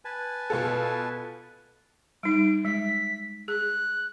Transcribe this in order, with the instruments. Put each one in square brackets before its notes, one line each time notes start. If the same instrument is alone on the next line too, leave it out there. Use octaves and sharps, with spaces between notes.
[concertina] B4 G#5 A5
[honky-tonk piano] B2 F4 A4
[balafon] G3 D#4 [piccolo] D7
[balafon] G#3 [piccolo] B6
[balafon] G#4 [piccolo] F#6